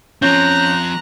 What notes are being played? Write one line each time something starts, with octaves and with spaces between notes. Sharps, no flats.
F3 C4 C#4 A#5 F#6 G6